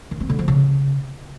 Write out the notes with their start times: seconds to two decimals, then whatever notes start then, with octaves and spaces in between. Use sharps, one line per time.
0.11 D#3
0.20 C4
0.30 D3
0.39 F3
0.48 C#3